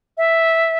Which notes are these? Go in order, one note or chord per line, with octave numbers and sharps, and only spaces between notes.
E5